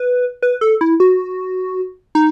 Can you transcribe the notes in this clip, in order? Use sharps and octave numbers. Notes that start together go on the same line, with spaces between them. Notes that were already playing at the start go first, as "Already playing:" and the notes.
Already playing: B4
B4
A4
E4
F#4
D#4